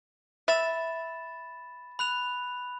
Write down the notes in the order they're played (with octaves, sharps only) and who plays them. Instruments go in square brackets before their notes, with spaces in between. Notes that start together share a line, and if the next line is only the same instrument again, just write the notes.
[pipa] E5 [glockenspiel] B5 A6 E7
[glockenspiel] B5 F#6 F7